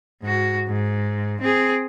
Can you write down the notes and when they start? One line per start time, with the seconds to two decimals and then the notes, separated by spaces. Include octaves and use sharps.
0.22 G#2 F#4
0.68 G#2
1.41 C4 G#4